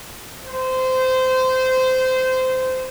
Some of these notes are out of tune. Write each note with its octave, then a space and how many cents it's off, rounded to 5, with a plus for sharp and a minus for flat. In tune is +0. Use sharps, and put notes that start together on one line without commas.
C5 -20